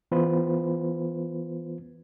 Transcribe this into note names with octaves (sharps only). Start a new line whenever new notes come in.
E3 B3 F4 B4 C5